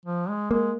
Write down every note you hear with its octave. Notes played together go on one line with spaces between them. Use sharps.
F3
G#3
G#3 A#3